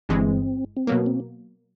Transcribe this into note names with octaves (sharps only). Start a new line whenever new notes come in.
G1 G2 E3 G#3 C4
C4
B2 F#3 A#3 B3
C4